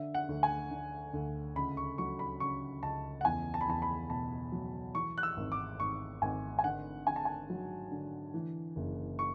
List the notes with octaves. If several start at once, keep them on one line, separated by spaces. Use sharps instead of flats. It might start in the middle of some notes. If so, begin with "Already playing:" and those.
Already playing: D3 E5
F#5
D2
G#5
D3
D2
C#2 B5
C#6
F#3 C#6
B5
C#3 C#6
C#2 A5
F#5
E2 G#5
A5
B5
E2 A5
B5
B2 A5
F#3
E3 C#6
F#6
E6
G#1
D6
G#1 C#6
G#1 G#5
G#5
D3 F#5
D3 G#5
A5
G#5
F#3
D3
E3
F#1
C#6